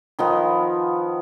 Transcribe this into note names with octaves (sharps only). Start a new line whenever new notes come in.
D#3 F3 B3